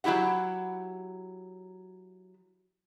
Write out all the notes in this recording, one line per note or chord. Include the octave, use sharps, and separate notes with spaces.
F#3 D#4 E4 G4 F#5